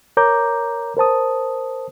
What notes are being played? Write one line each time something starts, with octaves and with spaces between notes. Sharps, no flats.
A#4 C#5 A#5 D6 G6
A#4 C5 A5 D#6